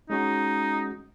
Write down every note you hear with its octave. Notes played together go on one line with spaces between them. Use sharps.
G#3 C#4 D#4 F#4